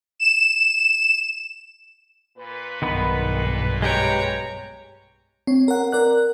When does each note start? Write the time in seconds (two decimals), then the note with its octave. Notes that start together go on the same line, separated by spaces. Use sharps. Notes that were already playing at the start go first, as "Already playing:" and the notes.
0.20 E7
2.38 A#2 B4
2.82 B1 G2 D#3 B3 B5
3.82 G#3 G4 C#5 G5 A#5
5.47 C4 C#5
5.68 A#4 F#5
5.92 A#4 D5 F#6